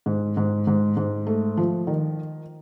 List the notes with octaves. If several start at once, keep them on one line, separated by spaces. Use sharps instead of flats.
G#2
G#2
G#2
G#2
A3
F3
D#3